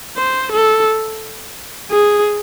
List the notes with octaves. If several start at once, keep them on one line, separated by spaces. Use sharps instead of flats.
C5
A4
G#4